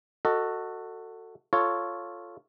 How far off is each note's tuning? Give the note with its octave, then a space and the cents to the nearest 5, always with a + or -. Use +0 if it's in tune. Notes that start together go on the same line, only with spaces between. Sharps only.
F#4 +0 A4 +25 D#5 +0
F4 +0 A4 +5 C#5 +0